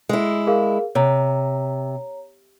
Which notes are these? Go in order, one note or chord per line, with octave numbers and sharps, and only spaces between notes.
G#3 E4
G#4 A#4 F5
C3 C#5 A#5